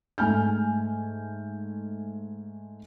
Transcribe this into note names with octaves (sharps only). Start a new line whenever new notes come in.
G#2 A3 G#5 F6 G6